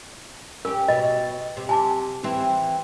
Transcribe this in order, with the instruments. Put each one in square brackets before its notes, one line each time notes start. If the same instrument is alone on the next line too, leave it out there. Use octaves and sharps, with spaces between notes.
[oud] C#4 G4 [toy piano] A#4
[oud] B2 [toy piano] D#5
[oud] C3
[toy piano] G#5 A5 D6
[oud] E3 C4 E4